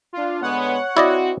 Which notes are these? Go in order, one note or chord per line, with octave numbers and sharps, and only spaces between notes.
D4 F4
D3 G#3 B3 C#5 F#5
C4 E4 F#4 D5 D#5